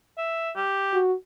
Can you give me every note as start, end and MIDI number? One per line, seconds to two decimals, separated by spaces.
0.18 0.51 76
0.56 0.99 67
0.93 1.14 66